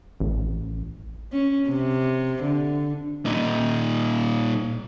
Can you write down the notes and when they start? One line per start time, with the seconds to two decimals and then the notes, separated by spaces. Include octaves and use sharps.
0.20 A1
1.32 C#4
1.69 C3
2.42 D3
3.26 A#2 D#4